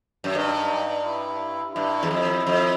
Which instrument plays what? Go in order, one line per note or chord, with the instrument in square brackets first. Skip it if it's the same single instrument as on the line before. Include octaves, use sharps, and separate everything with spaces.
[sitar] F#2
[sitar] G2 [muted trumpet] D#4
[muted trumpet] E4
[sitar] G2 [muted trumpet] E4
[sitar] E2
F2
F2